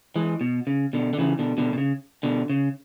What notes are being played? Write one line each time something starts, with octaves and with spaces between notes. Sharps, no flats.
E3 G#3
B2
C#3
B2 D3
D3
C#3 E3
B2 D3
B2 D3
B2
C#3
B2 D3
C#3